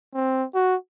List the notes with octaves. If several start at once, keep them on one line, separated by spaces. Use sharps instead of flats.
C4
F#4